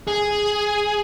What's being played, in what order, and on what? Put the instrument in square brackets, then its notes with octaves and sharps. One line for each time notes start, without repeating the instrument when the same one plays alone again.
[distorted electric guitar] G#4